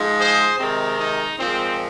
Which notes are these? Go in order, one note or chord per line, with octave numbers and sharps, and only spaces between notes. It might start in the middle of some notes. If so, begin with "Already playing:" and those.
Already playing: G#2 F3 G#3
G#4 C5
C3 D#3 G#3 C4
D#4
A#2 F3 G#3 C4